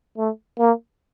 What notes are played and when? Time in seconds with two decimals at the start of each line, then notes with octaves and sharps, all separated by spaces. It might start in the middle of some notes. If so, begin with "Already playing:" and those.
0.17 A3
0.59 A#3